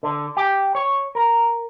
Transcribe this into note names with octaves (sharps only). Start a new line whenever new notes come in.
D3
G4
C#5
A#4